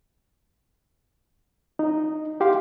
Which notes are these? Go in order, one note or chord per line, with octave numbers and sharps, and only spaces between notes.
D#4
E4 G4 F5 C6